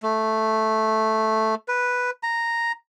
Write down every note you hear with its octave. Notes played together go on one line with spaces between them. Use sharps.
A3
B4
A#5